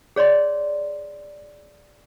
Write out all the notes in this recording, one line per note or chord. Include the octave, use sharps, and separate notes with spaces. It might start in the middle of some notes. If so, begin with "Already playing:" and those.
G#4 C#5 D5 C6